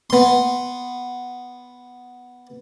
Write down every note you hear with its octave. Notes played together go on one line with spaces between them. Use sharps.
B3 C6